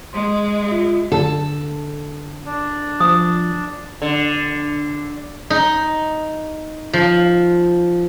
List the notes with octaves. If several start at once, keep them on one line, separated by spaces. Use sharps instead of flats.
G#3 C6
F4 E5
D3 A4
D4
F3 D#6
D3
D#4
F3